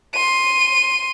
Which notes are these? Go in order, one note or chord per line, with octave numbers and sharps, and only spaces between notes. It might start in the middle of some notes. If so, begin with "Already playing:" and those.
C6 D#7